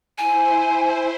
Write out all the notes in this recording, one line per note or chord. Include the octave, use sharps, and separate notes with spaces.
E4 C5 G#5